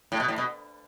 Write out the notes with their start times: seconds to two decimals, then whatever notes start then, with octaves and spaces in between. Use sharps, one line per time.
0.12 A2
0.20 B2
0.28 A2
0.38 B2